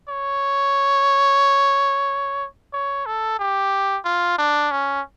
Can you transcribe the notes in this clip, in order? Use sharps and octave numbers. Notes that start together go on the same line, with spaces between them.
C#5
C#5
A4
G4
F4
D4
C#4